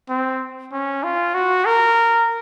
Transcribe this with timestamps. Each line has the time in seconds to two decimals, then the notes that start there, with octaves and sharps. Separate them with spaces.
0.09 C4
0.72 C#4
1.03 F4
1.34 F#4
1.65 A#4